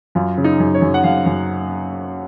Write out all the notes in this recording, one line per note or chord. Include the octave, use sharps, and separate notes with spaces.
F#2 F4
C#3
D#4
F#2
C#5
F#2
F#5
F#2 F5
F#2